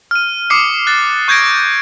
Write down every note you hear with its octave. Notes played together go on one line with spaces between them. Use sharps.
F6 D#7
D6 D#6 F6 C7 C#7
F#6 A6
C#6 G6 G#6 A#6 D7